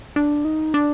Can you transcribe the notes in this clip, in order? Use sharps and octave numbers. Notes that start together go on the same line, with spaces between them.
D4
D#4
D4